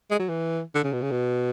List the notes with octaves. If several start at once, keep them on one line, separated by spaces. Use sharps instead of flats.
G#3
F#3
E3
D3
C#3
B2
C#3
B2